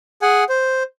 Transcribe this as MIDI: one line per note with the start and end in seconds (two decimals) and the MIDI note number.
0.22 0.44 68
0.22 0.44 78
0.22 0.44 80
0.49 0.83 72